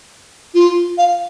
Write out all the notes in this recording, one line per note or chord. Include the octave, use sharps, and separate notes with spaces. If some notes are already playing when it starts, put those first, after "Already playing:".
F4
F5